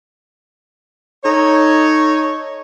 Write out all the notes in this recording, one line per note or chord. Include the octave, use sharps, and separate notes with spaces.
D#4 A4 C#5